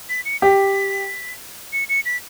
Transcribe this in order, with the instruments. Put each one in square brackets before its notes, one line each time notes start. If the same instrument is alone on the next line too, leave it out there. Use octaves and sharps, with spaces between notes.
[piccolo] B6
C#7
[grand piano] G4 [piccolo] B6
[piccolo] C#7
C#7
B6